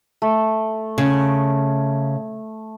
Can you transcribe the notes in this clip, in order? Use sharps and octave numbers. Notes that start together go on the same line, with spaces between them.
A3
C#3